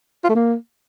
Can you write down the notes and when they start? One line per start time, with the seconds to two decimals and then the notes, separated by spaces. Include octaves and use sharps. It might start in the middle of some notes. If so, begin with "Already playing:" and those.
0.24 F4
0.29 A3
0.35 A#3